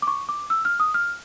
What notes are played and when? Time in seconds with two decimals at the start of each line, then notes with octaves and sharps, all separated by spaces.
0.02 D6
0.07 C#6
0.29 D6
0.50 E6
0.65 F6
0.80 D#6
0.94 F6